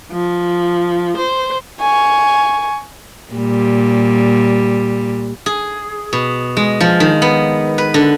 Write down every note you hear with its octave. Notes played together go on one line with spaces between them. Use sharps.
F3
C5
G#5 C#6
A#2 G3
G#4
B2
G#3
F3
D#3
B3
B4
D3